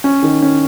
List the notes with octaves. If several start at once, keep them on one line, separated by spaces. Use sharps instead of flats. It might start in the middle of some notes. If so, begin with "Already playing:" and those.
C#4
D#3
C#4